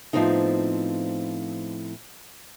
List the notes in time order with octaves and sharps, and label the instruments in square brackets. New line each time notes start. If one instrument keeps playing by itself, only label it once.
[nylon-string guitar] A2 F3 G#3 B3 C4 D#4